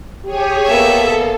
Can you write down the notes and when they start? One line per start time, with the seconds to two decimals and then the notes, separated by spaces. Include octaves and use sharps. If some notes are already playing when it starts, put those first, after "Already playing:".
0.25 G4 G#4 C#5 G#5
0.67 A#3 B3 A4 E5